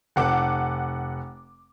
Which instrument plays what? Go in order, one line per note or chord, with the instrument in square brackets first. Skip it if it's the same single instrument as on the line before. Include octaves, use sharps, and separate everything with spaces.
[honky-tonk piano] F1 F#5 D6